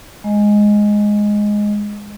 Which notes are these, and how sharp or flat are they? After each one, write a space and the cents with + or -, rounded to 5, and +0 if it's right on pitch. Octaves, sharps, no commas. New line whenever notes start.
G#3 +0 D#5 +0